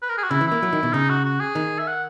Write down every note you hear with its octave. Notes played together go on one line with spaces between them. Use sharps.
B4
A#4
G#4
F#4
C#3 E4
E3
A#3 E4
F#3
D#3
B2
C#3 D#4
F#4
F#4
G#4
D#3
E5
F#5